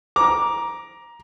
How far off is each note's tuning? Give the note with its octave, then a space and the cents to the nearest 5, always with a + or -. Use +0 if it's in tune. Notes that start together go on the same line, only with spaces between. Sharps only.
A#5 +15 D6 +0